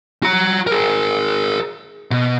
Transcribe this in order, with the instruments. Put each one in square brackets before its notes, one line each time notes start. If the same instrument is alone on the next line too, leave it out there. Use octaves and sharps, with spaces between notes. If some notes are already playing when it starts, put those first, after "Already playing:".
[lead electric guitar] F#4 A#5
G#4 A#4
B2